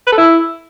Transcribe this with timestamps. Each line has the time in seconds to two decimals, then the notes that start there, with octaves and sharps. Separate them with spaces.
0.07 B4
0.12 A4
0.17 E4